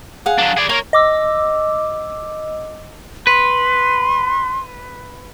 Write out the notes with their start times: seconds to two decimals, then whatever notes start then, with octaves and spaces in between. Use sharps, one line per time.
0.26 G#4 F5 F#5
0.39 F#3 D4
0.57 G#4 D5
0.69 A#3 C#5
0.93 D#5 D6 E6
3.27 B4 C6